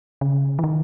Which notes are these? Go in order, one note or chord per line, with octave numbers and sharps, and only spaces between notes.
C#3
E3
D#3